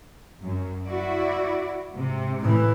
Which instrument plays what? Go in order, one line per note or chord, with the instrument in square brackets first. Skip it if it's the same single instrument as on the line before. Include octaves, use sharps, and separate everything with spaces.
[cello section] F#2
E4 F#4 D5
G#2 C3
[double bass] A2 E3